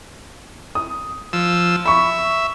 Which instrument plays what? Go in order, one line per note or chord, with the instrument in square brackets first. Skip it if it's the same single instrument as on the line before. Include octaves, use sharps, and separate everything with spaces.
[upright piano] D#6
[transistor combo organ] F3 E6
[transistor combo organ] E5 [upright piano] B5 C#6